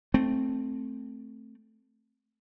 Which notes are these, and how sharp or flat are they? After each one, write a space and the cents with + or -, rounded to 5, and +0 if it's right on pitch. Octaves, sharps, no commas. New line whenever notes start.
A3 +0 C4 +0